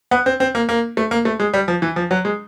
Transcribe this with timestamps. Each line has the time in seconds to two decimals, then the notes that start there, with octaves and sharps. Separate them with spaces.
0.11 B3
0.26 C4
0.40 C4
0.55 A#3
0.69 A#3
0.97 A3
1.11 A#3
1.25 A3
1.40 G#3
1.54 G3
1.68 F3
1.82 E3
1.96 F3
2.11 F#3
2.25 G#3